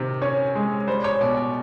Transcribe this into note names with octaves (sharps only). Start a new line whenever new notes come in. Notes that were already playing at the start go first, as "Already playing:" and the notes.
Already playing: C3 D#3
C#4 C#5
G#3
G3 C5
C#5
B2 D5
D5